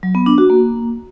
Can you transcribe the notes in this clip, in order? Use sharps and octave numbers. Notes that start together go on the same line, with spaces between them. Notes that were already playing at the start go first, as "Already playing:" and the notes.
F#3
B3
D4
F#4
A#3